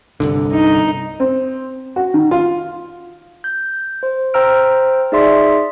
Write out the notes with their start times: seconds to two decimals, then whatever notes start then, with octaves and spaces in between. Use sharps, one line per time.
0.20 G1 C2 D3
0.52 D#4
1.20 C4
1.96 F#4
2.14 D#3
2.31 F4
3.44 G6
4.03 C5
4.34 C5 G5 A#5 E6 F6 D7
5.12 D#4 G#4 D5 E5 C6